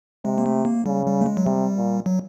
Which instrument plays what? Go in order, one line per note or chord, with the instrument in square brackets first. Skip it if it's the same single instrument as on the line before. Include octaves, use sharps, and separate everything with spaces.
[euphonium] C3 [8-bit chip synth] G#3
[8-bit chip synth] A#3
A3
A#3
[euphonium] C#3 [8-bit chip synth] G3
[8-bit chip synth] G3
A3
G#3
F#3
[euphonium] C3 [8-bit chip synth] G3
[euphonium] A#2
[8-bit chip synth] F#3